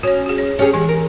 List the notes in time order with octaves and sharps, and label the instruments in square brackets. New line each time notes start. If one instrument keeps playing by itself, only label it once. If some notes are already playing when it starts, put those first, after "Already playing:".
[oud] C#4 [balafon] F#4 C#5
[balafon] F#4 G#4
C#5
[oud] C#4 G4 G#4
[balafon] E3 [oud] G#3
[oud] A#4